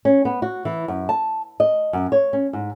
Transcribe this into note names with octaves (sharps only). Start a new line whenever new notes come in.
C#4
B3
F#4
E3
F#2
A5
D#5
F#2
C#5
C#4
G#2